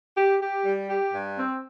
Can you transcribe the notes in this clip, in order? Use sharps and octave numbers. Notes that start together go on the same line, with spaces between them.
G4
G4
G3
G4
G2
C4